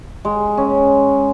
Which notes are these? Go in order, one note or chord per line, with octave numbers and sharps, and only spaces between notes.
G#3
C#4